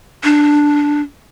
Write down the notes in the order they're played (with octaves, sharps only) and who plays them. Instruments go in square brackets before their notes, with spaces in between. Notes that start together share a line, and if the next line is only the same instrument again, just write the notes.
[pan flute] D4